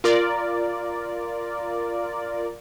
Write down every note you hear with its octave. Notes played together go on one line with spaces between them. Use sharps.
F4 A#4 D5